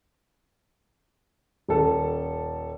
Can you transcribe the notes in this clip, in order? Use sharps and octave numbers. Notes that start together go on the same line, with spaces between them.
D#1 A4